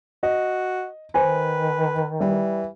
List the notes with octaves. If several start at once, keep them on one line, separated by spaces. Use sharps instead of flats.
F#4 D#5
D#3 B4 C5 G#5
E3 G3